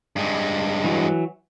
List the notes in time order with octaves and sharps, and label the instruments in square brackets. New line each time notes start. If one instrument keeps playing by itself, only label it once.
[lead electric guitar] G2 G#3
[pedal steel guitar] E3 F#3